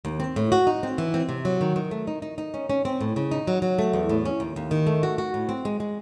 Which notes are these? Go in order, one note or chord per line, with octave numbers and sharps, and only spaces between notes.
D#2
C4
A2
F#4
D#4
C4
E3
C4
C3
F#3
D#3
D#3
A3
D#4
D#4
D#4
C#4
C#4
C4
A2
C#3
D#4
F#3
F#3
A3
E2
A2
C#4
D#2
D#2
D#3
A3
F#4
F#4
A2
C4
G#3
G#3